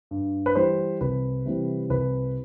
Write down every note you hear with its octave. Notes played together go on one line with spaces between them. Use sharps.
G2
B4
E3 G3 C5
C2 B4
C3 E3 G3
C2 B4